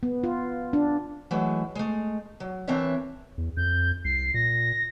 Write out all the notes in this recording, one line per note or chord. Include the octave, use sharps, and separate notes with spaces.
B3
F4
D4
E3 F#3 G#3 A3
G#3 A3
F#3
E3 C4 D4 A#4 C#5 E5
E2
F2 G6
C2 C7
A#2 A#6